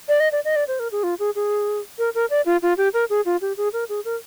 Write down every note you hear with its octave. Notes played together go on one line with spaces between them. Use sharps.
D5
D#5
D5
D#5
D5
C5
A#4
G#4
F4
G#4
G#4
A#4
A#4
D5
F4
F4
G4
A#4
G#4
F4
G4
G#4
A#4
G#4
A#4